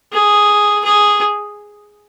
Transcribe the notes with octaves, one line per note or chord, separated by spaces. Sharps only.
G#4
G#4